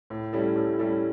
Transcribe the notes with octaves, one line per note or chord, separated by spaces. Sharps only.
A2
G3 C#4 E4 A4
A2
G3 C#4 E4 A4